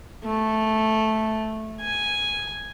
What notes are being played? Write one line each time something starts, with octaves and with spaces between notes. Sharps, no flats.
A3
G#5